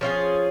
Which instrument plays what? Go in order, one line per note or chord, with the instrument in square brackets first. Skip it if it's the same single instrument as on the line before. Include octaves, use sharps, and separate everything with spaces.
[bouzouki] F3 C#4 F4 G#4